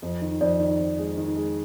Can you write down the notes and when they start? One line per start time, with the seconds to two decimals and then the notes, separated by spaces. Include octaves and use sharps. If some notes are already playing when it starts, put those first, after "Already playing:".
0.02 F2
0.22 D#3
0.41 F2 D5
0.60 D#3
0.78 F2
0.98 G#3
1.17 D#3
1.36 G#3